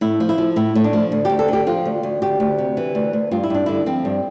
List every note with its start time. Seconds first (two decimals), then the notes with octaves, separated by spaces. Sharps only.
0.01 A2 E4
0.20 F3
0.29 E4
0.38 F3
0.56 A2 E4
0.75 A2
0.84 D4
0.93 F3
1.12 D2
1.25 G4
1.30 D2
1.39 A4
1.48 D3 G4
1.67 F3 F4
1.86 D2
2.03 D2
2.22 D2 G4
2.40 D2
2.58 C3
2.77 E3
2.95 D2
3.13 D2
3.31 G2 F4
3.43 E4
3.50 G2 D4
3.66 D3 E4
3.86 F3 C4
4.05 G2